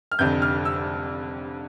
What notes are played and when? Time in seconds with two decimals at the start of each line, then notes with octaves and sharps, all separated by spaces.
0.11 F6
0.19 F1 F2 D3 G6
0.42 F6
0.65 E6